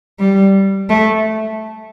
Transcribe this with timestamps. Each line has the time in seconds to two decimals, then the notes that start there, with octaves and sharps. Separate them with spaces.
0.19 G3
0.90 A3